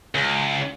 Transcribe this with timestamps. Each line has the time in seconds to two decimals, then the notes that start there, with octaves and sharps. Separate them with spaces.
0.15 C#2